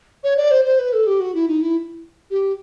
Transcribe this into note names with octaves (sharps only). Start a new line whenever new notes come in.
C#5
D5
C5
C5
B4
A4
G4
F#4
E4
D#4
E4
G4